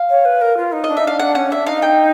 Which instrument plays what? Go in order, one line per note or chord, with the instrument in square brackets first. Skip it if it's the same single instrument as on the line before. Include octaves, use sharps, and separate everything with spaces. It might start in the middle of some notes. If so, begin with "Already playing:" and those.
Already playing: [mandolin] F5
[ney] C#5
B4
A#4
F4
D#4
[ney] D4 [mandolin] D#5
[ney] D#4 [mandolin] E5
[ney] D4 [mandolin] F5
[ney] D4 [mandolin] F#5
[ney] C#4 [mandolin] F#5
[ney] D4 [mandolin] E5
[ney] D#4 [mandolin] F5
[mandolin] G5